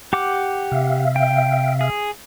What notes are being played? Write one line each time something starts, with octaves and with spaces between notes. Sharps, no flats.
G4 F#5 D6
C3 E5 F5
G5
G#4